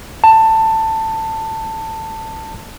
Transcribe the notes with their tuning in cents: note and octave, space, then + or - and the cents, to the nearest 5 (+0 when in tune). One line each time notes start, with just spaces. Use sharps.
A5 +15